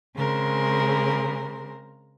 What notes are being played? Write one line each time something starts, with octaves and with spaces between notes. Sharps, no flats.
C#3 G#3 C4 A#4